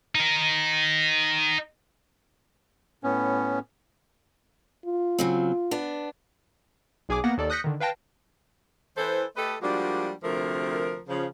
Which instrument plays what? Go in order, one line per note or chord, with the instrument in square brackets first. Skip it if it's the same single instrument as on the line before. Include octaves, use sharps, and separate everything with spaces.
[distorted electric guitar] D#4 A#4
[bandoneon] A2 B3 C#4
[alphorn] F4
[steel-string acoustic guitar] C#3 F#3 C4
B3 D4
[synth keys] B1 G#4 G#5 D6
A#3 B3 F#5 A#6
D#2 A4 D5
D#6 F#6 G6 A#6 B6 C#7
D3 D#3
B4 F5 G5 A5 A#6
[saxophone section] E3 A4 C5
A3 G4 A4 B4 D#5
F3 G3 G#3 A#3 D4 F#4
D2 C3 F3 A3 A#4
C#3 F3